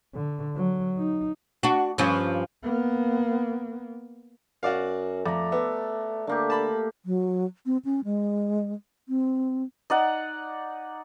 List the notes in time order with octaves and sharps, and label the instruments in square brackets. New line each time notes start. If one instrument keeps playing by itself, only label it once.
[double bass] D3
F#3
D#4
[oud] D4 F#4
G2 F3 C#4
[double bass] A#3 B3
[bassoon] F#2 [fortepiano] F#4 D5 F5
[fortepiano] F2 [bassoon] A3 [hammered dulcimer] D5 A#5
[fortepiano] B3 [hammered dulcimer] E5
[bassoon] D3 [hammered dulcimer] A3 A#3 G4
[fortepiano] A5 B5
[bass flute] F#3
C4
C#4
G#3
C4
[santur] D#4 D5 F#5